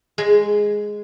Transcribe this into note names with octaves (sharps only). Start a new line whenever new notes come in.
G#3